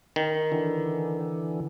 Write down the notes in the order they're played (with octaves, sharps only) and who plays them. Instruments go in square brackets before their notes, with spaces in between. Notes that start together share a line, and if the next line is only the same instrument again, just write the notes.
[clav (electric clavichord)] D#3
[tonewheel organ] D3 E3